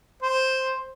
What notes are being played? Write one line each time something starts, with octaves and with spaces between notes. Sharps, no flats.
C5